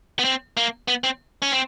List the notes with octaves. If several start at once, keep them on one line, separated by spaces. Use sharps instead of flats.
B3
C4
A#3
B3
C4
C#4
C4